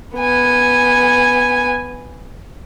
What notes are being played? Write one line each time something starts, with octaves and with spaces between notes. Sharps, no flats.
B3 G#5